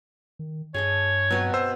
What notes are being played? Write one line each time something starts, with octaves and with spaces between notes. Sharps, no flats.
D#3
G2 G#4 A4 C#5 D#5
B2 F#3 C4 B4
C5 E6